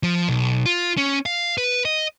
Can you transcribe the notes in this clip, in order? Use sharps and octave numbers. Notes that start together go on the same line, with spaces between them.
F3
B1
F4
C#4
F5
B4
D#5